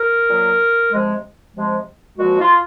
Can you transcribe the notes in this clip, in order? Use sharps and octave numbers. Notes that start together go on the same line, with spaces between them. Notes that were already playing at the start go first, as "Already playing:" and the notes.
Already playing: A#4
A#2 F#3
C3 F3 G#3
C3 F3 G#3
A#2 F3 G#3 F#4
F4